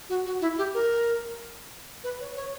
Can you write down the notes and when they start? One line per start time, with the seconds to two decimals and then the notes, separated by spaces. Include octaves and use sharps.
0.09 F#4
0.26 F#4
0.41 E4
0.58 G4
0.74 A#4
2.04 B4
2.21 C#5
2.36 C#5